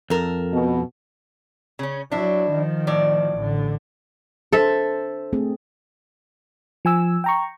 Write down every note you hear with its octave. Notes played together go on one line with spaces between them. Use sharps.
F2 A4 A#4
B2
C#3 C#4
F#3 D4 E4
D#3 F3
A2 D5
A1 D3
D4 A4 C5 E5
A3 C4 G#4
F3 G#5 E6
G5 A#5 C#6